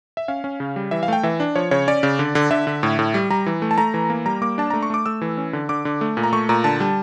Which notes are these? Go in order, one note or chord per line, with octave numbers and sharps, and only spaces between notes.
E5
C#4 F5
C#4
C#3
G3
E3 E5
F5
A3 G5
E3 E5
D4
F3 C#5
C#3 C#5
C#4 D5
C#3
D3
D3
D3 E5
D3
A2
A2
G3
G3 A#5
E3
A3
A5
A3 A#5
E3
A#3
G3 A#5
A#3 D6
D4 A5
A3 A#5
C#6
A3 D6
A3 E6
E3
C#4
D3
D3 D6
D3
A3
A#2
A#5
A3 C#6
A#2 A#5
D3 A5
G3